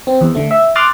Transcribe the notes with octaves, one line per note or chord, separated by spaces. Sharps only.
C4
E2
D3 A3
E5
C6 D6 D#6 F6 F#6 A6